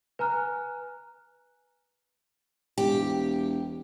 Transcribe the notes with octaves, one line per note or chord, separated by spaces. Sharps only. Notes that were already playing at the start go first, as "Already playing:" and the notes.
B4 G#5 A#5 F6 F#6
E1 G4